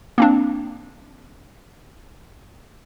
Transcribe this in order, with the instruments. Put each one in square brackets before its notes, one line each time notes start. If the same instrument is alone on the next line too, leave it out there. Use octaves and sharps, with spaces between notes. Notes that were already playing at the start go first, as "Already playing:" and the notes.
[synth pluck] A#3 C4 D4